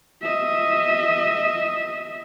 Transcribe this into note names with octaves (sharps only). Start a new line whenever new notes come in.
D#5 E5